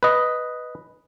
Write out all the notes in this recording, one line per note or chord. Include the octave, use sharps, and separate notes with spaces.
B4 D#5